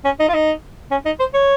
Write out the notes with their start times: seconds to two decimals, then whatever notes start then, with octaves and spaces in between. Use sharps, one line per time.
0.05 C#4
0.20 D#4
0.29 F4
0.34 D#4
0.91 C#4
1.06 D#4
1.20 C5
1.34 C#5